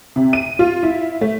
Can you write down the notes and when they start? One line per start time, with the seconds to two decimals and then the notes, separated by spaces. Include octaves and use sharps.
0.16 C3
0.33 D#7
0.59 F4
0.83 E4
1.21 A3